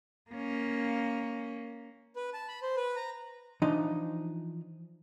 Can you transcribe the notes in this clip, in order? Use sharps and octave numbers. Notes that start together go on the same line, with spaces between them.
A#3 C#4
B4
A5
B5
C5
B4
A#5
E3 F3 D4 D#4 D#5